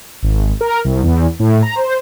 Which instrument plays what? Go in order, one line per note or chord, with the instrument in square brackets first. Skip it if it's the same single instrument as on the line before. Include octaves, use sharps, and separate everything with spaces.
[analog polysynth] G#1
A#4
C2
E2
A2
A#5
C5